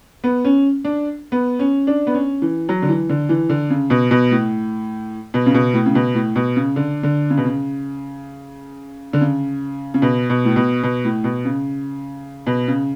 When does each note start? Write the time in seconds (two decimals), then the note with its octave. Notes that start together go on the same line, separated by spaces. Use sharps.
0.24 B3
0.45 C#4
0.85 D4
1.32 B3
1.59 C#4
1.87 D4
2.07 B3
2.14 C#4
2.42 E3
2.69 F#3
2.82 D3
2.89 E3
3.09 D3
3.29 E3
3.50 D3
3.70 C#3
3.90 B2
4.11 B2
4.31 A2
5.34 B2
5.46 C#3
5.54 B2
5.74 A2
5.86 C#3
5.95 B2
6.14 A2
6.36 B2
6.56 C#3
6.76 D3
7.03 D3
7.30 C#3
7.37 B2
7.45 C#3
9.13 D3
9.21 C#3
9.94 C#3
10.02 B2
10.30 B2
10.45 A2
10.56 B2
10.83 B2
11.05 A2
11.24 B2
11.45 C#3
12.47 B2
12.68 C#3